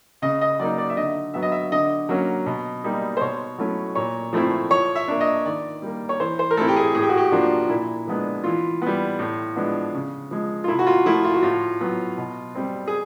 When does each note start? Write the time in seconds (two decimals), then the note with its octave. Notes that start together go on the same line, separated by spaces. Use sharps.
0.22 C#3 D#5
0.41 D#5
0.59 F#3 A#3 D#4 D5
0.78 D5
0.90 E5
0.97 D3 D#5
1.34 F#3 B3 E5
1.42 D#5
1.52 E5
1.72 D3 D#5
2.09 F#3 A#3 C#4
2.46 B2
2.84 G3 A#3 D#4
3.17 C5
3.21 B2 C#5
3.58 F#3 A3 C#4 E4
3.95 A#2 C#5
4.33 F3 A3 C4 E4
4.71 F3 C#5
4.95 E5
5.08 A#3 D4
5.21 D#5
5.45 D#3 D5
5.82 G3 A#3
6.09 C#5
6.20 E3 C5
6.39 C5
6.51 A#4
6.57 A3 C4 E4 A4
6.68 G4
6.76 G#4
6.95 A2 G#4
7.02 G4
7.09 F#4
7.18 G4
7.32 F3 A#3 D4 F4
7.69 A#2 E4
8.07 F3 G#3 B3 D4
8.44 E3 F4
8.82 G3 B3
9.19 A2
9.56 F3 G#3 B3 D4
9.94 C#3
10.31 F3 G#3
10.64 F4
10.68 C3 E4
10.79 F#4
10.87 F4
11.06 F3 A3 E4
11.24 F4
11.34 F#4
11.43 A2 F4
11.81 F#3 B3
12.18 B2
12.55 G3 C4
12.87 G#4